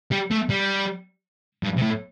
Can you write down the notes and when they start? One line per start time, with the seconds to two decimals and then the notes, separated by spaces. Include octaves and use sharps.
0.11 G3
0.31 A3
0.50 G3
1.64 G2
1.78 C3
1.83 A2